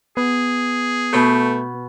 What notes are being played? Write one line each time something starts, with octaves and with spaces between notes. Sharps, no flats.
B3 G#4
B2 A3 B5 G6